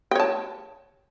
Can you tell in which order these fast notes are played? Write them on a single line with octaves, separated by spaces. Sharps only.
G5 C#5 A5